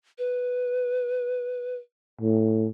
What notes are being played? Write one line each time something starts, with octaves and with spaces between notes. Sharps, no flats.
B4
A2